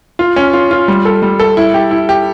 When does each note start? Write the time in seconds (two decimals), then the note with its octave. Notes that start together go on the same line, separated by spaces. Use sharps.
0.19 F4
0.36 C#4
0.53 F4
0.71 F4
0.88 G3
1.05 A4
1.22 G3
1.40 A4
1.57 E4
1.74 G4
1.91 E4
2.09 G4